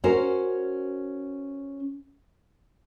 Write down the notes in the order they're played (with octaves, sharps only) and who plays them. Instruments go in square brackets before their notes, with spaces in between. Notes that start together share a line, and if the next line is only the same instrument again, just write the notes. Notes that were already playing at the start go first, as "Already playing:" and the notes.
[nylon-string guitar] C#4 F#4 A#4 C5